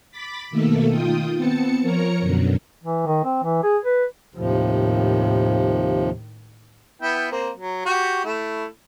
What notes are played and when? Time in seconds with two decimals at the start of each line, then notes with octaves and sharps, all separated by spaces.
0.11 B5 D6 A6 B6
0.50 B2 D#3 A3 A#3 A4
0.90 D#3 F4 G5 D#6
1.35 B3 C4 A5 C#7
1.81 F3 A#4 C#5 A#5 C#7
2.21 F#2 B2 D3
2.84 E3
3.07 D#3
3.24 C4
3.44 E3
3.63 G#4
3.85 B4
4.35 D#2 A2 C3 D#3 F3
7.02 B3 E4 G5
7.32 A#3 C4
7.57 F#3
7.86 F#4 G4
8.25 A3 E4